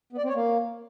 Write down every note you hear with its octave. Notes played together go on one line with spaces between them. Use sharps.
B3
D5
C4
C#5
A#3